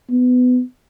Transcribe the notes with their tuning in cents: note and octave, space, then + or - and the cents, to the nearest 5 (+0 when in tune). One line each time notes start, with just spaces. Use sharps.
B3 +20